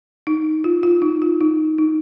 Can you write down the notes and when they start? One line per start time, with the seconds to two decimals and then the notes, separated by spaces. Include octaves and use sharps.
0.27 D#4
0.64 F4
0.83 F4
1.02 D#4
1.22 F4
1.41 D#4
1.78 D#4